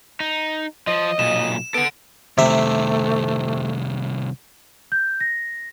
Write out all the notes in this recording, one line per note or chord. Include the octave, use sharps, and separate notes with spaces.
D#4
F3 D#5
B1 A#2 E7
B3 A4 F#5 D7
C2 C3 D#3 A3 E5
G6
A#6